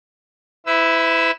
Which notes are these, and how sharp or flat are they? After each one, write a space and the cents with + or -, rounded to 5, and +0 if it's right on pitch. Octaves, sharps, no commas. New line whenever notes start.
E4 +0 B4 +45 E6 +0